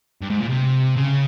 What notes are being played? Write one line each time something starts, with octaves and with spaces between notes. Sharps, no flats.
G2
G#2
A#2
C3
C#3